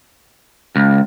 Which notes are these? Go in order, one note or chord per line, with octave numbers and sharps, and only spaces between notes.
C#2